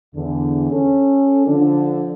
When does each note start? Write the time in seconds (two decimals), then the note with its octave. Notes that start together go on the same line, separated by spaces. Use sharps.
0.15 E2 D3
0.71 C#4 A4
1.46 D3 F3 D4